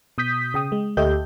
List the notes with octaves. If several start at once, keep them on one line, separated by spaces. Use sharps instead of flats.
B2 D#6 G6 B6
C#3 G5 D#6
G#3
D2 G4 A4 D#5 E5 G6